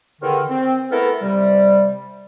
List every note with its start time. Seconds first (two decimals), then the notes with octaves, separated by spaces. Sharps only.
0.21 E2 D3 D#3
0.49 C4
0.92 A3 B3 E4 A4 A#4
1.21 C3 G3